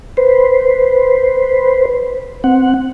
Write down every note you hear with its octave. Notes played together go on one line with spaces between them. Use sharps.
B4 C5
C4 F#5